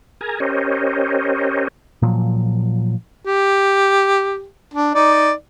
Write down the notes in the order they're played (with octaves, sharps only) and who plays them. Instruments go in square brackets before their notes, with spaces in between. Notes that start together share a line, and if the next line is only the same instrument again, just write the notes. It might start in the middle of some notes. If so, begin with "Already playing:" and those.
[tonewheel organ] G#4 A#4 G#5 A#5
C#4 G4 A#4 C5 C#5 D#5
[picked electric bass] A#2 F3 F#3
[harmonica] G4
D4
D#4 D5